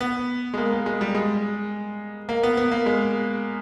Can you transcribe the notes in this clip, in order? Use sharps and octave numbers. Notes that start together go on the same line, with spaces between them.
B3
G#3
A#3
A#3
G#3
G3
G#3
A#3
B3
B3
A#3
G#3